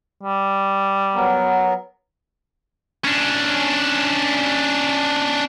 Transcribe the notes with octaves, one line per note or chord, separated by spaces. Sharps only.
G3
F#3 B3 A#4
C#4 D4